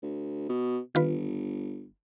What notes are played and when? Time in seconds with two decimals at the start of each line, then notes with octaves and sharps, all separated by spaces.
0.03 D2
0.49 B2
0.95 G1 D#3 F4 B4